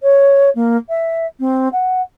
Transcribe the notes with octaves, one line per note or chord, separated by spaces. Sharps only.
C#5
A#3
E5
C4
F#5